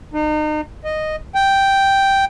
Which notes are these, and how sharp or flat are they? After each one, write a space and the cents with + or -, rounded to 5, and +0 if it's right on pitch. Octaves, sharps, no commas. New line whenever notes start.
D#4 -35
D#5 -5
G5 +0